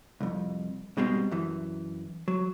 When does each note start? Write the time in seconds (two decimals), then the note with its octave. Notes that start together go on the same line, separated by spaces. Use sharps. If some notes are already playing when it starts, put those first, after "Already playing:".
0.20 C2 F2
0.97 G#2 B2 G3 G#3 C4
1.31 F#2 E3
2.28 F#3